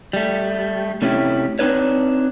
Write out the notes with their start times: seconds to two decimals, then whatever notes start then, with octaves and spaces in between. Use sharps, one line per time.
0.13 G3 A3
1.02 C3 A3 C#4 E4 G4
1.59 C4 D4 D#4 B4 C#5